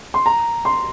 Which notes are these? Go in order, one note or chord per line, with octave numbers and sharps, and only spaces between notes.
C6
A#5
C6